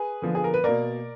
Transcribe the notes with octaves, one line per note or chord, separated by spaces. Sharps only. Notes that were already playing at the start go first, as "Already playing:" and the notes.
Already playing: G#4 B4
D3 F3 B3
G#4
A#4
B4
B2 A#3 A#4 D5